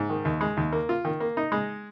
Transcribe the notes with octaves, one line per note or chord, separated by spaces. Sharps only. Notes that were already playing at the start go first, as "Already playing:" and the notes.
Already playing: G#2
D#3
D#2
G#3
D#2
A#3
F4
D#3
A#3
D#4
G#3